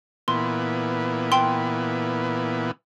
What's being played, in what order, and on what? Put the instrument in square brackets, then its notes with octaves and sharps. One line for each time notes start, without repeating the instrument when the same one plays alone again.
[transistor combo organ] A#2 E3 B3 [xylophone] C6
[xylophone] G5 C6